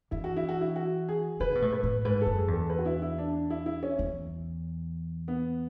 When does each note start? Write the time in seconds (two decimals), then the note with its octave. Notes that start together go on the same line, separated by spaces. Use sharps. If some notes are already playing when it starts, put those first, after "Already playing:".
0.11 E3 E4
0.24 F#4
0.37 E4
0.49 F#4
0.61 E4
0.76 F#4
1.09 G#4
1.40 C#3 B4
1.55 B2
1.62 A2
1.73 B4
1.83 A2
2.05 G#2 B4
2.22 F#2 A4
2.37 G#4
2.48 E2
2.53 A4
2.70 B4
2.79 F#4
2.86 E4
3.02 E4
3.18 D4
3.34 D4
3.50 E4
3.66 E4
3.83 C#4
3.99 E2
5.28 B3